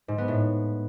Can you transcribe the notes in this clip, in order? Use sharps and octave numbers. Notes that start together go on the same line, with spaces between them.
G#2
B3
A2